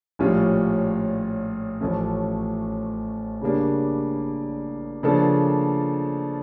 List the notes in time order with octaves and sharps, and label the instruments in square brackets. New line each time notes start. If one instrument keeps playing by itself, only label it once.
[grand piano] A#1 A2 G3 C#4 F4
A1 A2 F3 A3 C#4
C#3 G3 A#3 D4
C#3 F3 A#3 D4 A4